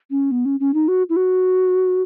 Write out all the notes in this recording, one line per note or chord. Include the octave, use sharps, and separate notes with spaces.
C#4
B3
C#4
C#4
D#4
F#4
E4
F#4